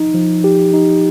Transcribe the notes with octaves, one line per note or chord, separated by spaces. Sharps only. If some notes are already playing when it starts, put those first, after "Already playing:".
Already playing: F3 D#4
F3
G4
D#4